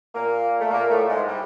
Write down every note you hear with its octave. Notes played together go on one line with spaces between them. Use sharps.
A#2 A#3
A3
A#2 A#3
A2 A3
G#2 G#3
G3